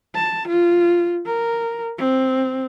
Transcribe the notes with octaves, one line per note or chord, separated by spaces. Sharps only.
A5
F4
A#4
C4